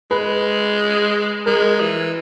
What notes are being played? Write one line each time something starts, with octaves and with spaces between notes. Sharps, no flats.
G#3 B4
G#3 A#4
E3